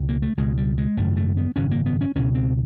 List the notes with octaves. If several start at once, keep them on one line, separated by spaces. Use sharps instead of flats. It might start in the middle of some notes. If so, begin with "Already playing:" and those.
Already playing: C#2 B2
A#3
A3
C#2 B2 G#3
G3
G#3
G#1 F#2 C#3 A3
A3
B3
G#1 F#2 C#3 C#4
A#3
B3
C#4
C#2 B2 C#4
C4